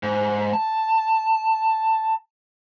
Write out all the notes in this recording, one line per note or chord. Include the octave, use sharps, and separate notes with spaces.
G#2
A5